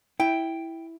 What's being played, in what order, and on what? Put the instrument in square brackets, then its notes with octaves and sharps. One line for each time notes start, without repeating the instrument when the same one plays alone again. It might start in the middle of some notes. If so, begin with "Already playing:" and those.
[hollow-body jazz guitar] E4 [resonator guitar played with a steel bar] G5